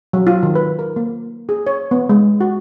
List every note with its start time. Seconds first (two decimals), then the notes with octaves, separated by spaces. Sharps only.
0.13 F#3
0.27 F4
0.43 D#3
0.55 B4
0.79 A#4
0.96 A#3
1.49 G#4
1.67 C#5
1.91 B3
2.09 G#3
2.40 F#4